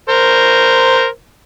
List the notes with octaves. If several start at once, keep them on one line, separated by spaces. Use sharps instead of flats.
A#4 C5